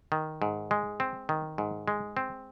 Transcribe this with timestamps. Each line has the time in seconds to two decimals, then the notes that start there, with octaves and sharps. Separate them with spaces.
0.12 D#3
0.42 G#2
0.71 G#3
1.00 C4
1.29 D#3
1.58 G#2
1.88 G#3
2.17 C4